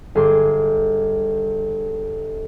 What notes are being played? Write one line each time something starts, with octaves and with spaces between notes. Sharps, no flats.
G1 G#4 C6 D6